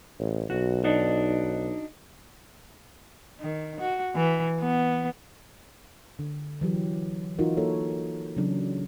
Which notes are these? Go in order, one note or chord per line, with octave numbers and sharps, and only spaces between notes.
A1
B1 F#4
D4 D#4 F#4
D#3
F#4
E3
B3
D3
E3 F#3 G4
E3 D#4 F4 F#4 A#4
A#3 A4 C#5
C#3 E3 F#3 D4